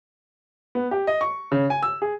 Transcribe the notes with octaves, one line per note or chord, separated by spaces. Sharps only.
B3
G4
D#5
C#6
C#3
G#5
E6
G#4